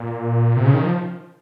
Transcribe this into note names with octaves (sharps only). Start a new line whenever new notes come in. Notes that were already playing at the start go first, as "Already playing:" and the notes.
Already playing: A#2
C3
C#3
D#3
F3